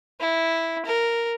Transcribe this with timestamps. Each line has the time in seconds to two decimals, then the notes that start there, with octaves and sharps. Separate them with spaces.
0.20 E4
0.86 A#4